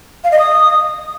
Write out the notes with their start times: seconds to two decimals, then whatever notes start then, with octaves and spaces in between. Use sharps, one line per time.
0.24 F5
0.32 D#5
0.39 D#6